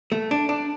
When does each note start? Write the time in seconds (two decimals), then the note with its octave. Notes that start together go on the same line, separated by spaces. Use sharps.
0.12 A3
0.31 D4
0.49 D4